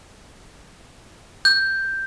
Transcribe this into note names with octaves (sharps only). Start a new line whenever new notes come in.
G6